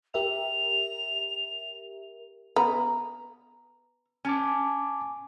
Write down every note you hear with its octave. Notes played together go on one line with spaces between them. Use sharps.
G4 A#4 E5 F7
B3 A#5
C#4 G#5 A5 D6